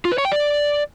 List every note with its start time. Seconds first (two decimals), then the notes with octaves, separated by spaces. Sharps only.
0.05 F4
0.12 B4
0.18 C#5
0.25 G5
0.32 D5